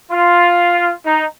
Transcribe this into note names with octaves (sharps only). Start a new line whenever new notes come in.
F4
D#4